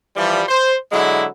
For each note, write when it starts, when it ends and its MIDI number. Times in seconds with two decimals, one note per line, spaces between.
0.16 0.42 52
0.16 0.42 53
0.16 0.42 55
0.48 0.75 72
0.92 1.26 50
0.92 1.26 54
0.92 1.26 56
0.92 1.26 64